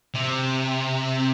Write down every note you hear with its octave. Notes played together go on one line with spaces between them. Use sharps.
C3